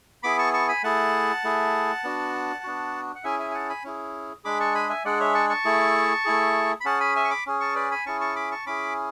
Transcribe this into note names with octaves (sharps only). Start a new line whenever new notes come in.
B3 E4 G#4 B5 D6
A5 C#6
A5 C#6
G#5 B5
A3 E4 G#4 F#5 A5
A3 E4 G#4
B3 D4 F#4
B3 D4 F#4
F#5
C#4 E4 G#4 E5 G#5
E5 G#5
G#5
F#5 A5
G#5 B5
C#4 E4 G#4
G#3 D4 G#4 B5 D6
A5 C#6
G#5 B5
E5 G#5
G#3 D4 G#4 D5 F#5
C#5 E5
A5 C#6
A5 C#6
A3 E4 G#4
A3 E4 G#4
B5
C#4 G#4 F#5 A5
G#5 B5
E5 G#5
C#6
B5 D6
C#4 G#4
A5 C#6
B4 D5
G#5 B5
C#4 E4 G#4 A5 C#6
A5 C#6
B5 D6
A5 C#6
C#4 E4 G#4 B5 D6